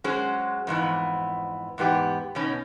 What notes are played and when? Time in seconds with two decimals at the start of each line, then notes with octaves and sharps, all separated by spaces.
0.04 F#3 G#3 C#4 G#4 C5
0.67 F2 G#2 E3 B3
1.78 E2 G#2 B3 G4
2.35 B2 B3 C#4 D#4